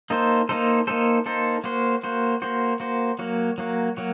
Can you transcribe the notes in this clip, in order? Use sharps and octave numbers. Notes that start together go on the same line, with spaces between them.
A#3 D#4 A4 C5
A#3 D#4 A4 C5
A#3 D#4 A4 C5
A#3 D#4 A4 C5
A#3 F#4 C5
A#3 F#4 C5
A#3 F#4 C5
A#3 F#4 C5
F#3 A#3 F#4
F#3 A#3 F#4
F#3 A#3 F#4